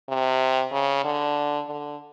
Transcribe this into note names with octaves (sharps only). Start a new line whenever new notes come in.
C3
C#3
D3
D3